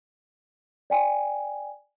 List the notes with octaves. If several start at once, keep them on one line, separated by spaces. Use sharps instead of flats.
D5 G5 G#5